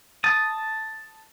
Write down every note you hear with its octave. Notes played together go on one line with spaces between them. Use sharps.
A5 D#6